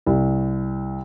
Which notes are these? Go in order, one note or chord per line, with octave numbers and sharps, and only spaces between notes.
C2